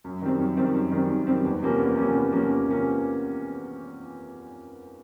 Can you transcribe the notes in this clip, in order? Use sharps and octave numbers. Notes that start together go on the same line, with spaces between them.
F#2
D#3 G3 C4
F#2
D#3 G3 C4
F#2
D#3 G3 C4
F#2
D#3 G3 C4
E2
C3 F3 A#3 C#4
E2
C3 F3 A#3 C#4
E2
C3 F3 A#3 C#4
E2
C3 F3 A#3 C#4